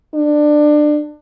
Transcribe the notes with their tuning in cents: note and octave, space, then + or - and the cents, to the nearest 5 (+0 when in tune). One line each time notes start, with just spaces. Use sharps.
D4 +20